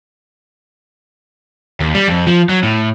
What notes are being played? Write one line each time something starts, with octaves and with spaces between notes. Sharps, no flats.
D#2
G3
F2
F3
F#3
A2